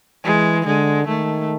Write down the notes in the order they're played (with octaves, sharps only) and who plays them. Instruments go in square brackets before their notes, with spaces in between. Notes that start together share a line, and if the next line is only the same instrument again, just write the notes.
[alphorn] E3 [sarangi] G#3
[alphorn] D3 [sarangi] G#3
[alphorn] D#3 [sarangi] A3